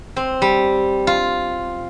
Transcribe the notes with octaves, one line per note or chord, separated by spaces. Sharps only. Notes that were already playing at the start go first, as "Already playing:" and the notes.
C4
G3
F4